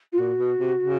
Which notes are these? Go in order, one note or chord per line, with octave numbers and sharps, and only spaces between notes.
F4
A#2 F#4
B2
C3
C#3